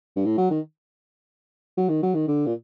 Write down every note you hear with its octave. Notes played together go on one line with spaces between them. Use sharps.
G2
A2
F#3
D#3
F#3
D#3
F#3
D#3
D3
A#2